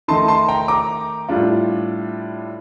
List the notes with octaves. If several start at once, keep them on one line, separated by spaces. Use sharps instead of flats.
D#3 A3 D#4 A5 C6
A5 C6
G5 A#5
A#5 D6
A2 G3 D4 F4